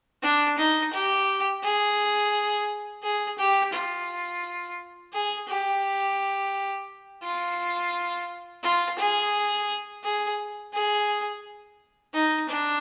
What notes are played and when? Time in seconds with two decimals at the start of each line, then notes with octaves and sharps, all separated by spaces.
0.23 D4
0.58 D#4
0.93 G4
1.63 G#4
3.03 G#4
3.38 G4
3.73 F4
5.13 G#4
5.48 G4
7.23 F4
8.63 F4
8.98 G#4
10.04 G#4
10.74 G#4
12.14 D#4
12.49 D4